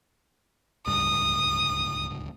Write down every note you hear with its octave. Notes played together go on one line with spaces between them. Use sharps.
D1 C#2 G2 D#6